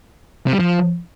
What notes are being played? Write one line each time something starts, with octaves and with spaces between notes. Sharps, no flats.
C3
G3
F3